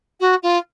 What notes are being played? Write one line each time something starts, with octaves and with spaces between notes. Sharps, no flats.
F#4
F4